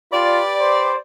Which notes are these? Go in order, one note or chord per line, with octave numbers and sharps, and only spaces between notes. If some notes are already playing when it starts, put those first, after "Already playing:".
F4 G4 B4 D5
C5